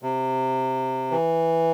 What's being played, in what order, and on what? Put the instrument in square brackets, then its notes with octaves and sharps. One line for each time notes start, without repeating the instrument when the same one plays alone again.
[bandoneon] C3
E3